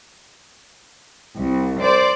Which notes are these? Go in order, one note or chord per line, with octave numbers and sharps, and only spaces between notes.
C2
C5 D5